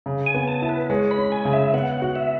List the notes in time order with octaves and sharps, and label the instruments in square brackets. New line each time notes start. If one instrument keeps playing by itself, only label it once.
[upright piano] C#3
[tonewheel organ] G#5
[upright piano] B3
[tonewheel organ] A5
[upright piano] E4
[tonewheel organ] B4
[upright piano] G#3 [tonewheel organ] C#5
[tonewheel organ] B5
[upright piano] C#4
[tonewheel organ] G#5
[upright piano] C#3
[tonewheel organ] E5
[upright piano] B3 [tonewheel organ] F#5
[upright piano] F#4
[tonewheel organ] E5